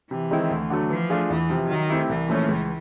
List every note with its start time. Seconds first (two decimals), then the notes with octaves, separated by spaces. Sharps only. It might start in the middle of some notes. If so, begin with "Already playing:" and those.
0.11 C3 E3
0.31 D#3 G#3 C4 E4
0.51 D2
0.70 D3 F#3 A3
0.90 E3 F3
1.10 A3 D4 F4 G#4
1.30 E2 E3
1.50 C3 F3
1.69 D#3 F#3
1.89 A3 C4 E4 G4
2.09 C2 E3
2.29 A#2 F3 A3 C#4
2.48 C#2